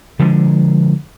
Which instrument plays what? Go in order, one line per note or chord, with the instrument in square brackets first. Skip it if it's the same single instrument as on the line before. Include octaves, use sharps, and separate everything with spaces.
[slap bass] D3 F3 G#3